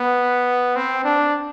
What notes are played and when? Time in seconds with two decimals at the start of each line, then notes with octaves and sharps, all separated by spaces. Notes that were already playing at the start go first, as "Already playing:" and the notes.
Already playing: B3
0.76 C4
1.05 D4